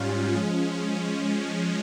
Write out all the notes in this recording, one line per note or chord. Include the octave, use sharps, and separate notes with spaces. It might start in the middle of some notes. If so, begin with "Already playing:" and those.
Already playing: G#2 G3 C#4 F4
F3 G#3 C#4